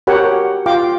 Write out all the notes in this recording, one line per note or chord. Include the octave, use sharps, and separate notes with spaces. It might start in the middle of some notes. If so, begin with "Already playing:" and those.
F#4 G4 A#4 C#5 F#5 G5
F4 F5 G5 D6